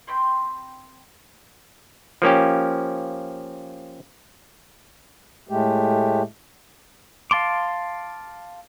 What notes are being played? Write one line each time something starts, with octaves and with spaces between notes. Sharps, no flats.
C4 G5 B5 C6
F3 A#3 C#4 G4
A2 G#3 A3 G4
F5 A5 C6 D6